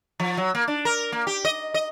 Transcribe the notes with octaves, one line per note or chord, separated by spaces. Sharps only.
F3
F#3
A#3
D4
A#4
A#3
G4
D#5
D#5